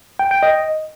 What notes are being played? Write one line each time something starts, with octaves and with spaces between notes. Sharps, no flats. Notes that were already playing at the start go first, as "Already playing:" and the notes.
G5
G5
D#5